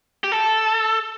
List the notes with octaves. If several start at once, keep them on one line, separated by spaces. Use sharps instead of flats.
G4
A4